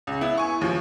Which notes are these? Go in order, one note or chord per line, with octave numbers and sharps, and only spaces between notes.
C#2
B3 E4
G#5 C#6
D#2 F3